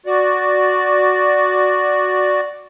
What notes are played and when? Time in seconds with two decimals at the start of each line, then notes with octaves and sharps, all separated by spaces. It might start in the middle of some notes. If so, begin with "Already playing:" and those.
0.06 F#4 D5